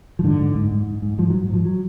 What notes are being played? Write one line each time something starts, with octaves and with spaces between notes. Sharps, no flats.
F3
G#2 D3
G#2
G#2
G#2
G#2
G#2
G#2 F3
F#3
G#2
G#2 F3
F#3